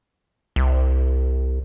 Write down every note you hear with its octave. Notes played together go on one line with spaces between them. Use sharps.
C2